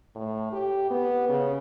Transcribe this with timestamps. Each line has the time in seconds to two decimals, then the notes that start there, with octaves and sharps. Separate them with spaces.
0.16 A2
0.52 G4
0.90 B3
1.29 C#3